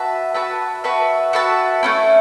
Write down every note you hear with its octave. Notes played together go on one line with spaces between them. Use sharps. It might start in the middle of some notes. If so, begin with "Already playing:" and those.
Already playing: F#4 B4 E5 A5
F#4 B4 E5 A5
F#4 B4 E5 A5
F#4 B4 E5 A5
A3 C#4 E4